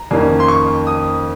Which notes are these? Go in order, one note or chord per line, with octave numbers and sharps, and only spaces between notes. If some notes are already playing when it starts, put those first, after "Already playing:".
Already playing: A#5
F2 D#3 A#3 C#4
C6
C#6
D#6